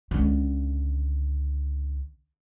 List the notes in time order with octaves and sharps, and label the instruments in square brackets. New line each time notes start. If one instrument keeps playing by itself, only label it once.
[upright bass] C#2 D3